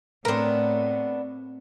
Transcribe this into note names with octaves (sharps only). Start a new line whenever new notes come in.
A2 B3 C4 D4 A#4